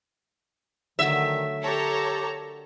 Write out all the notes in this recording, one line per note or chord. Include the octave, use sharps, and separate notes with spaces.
D3 D#3 F#3 A3 E5
G4 A4 A#4 C#5 A#5